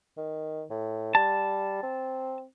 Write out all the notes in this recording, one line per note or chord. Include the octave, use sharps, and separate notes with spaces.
D#3
A2
G3 A5
C4